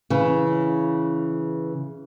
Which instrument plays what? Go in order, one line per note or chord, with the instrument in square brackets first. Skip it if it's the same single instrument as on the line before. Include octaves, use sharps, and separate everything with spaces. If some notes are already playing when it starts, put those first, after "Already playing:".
[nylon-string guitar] C#3 E3